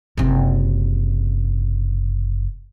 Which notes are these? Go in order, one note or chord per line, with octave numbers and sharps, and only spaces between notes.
F#1 C3